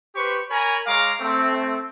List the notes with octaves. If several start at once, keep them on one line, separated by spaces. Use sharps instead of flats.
G4 B4 C5 C#6
A#4 C#5 G#5 A#5 B5
G#3 C#5 F5 A#5 D6
A3 C4